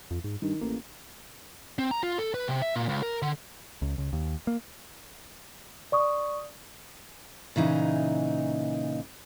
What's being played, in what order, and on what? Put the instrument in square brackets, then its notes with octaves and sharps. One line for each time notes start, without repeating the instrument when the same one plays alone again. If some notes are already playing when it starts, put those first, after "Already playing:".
[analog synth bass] F2
G#2
[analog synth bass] G2 [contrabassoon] D#3
[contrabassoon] A1 [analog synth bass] A#3
[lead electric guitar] C4
A#5
F4
A4
B4
C3
E5
A#2
C#2
A#4
D3
[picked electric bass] C#2
C#2
D#2
A#3
[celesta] D5 C#6 D#6
[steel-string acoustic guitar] A#2 C#3 E3 D#4